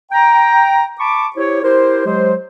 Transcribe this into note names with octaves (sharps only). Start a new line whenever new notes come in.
G5 A#5
A5 B5 C#6 D6
E4 G4 C5 C#5
E4 G4 A#4 C5
F#3 G#3 G4 C5